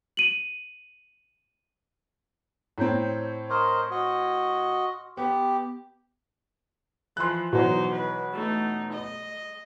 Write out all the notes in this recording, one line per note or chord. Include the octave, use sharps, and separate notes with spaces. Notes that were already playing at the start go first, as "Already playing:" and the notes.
D#7 F#7
A2 C4 C#5 A#5 G6
A#4 C5 D#5 C6 C#6 F6
F#4 D#5
B3 G4
E3 F3 C6 F#6
B2 E3 F#3 D#4 C5
B4
A3 D#4
D#5